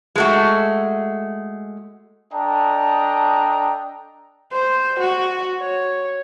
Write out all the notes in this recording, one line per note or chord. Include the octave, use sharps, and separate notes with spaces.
G#3 A3 F#4
D4 A4 D#5 G5 A#5
C5
F#4
C#5